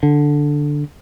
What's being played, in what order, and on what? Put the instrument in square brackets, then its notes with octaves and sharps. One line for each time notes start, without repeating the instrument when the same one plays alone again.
[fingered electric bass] D3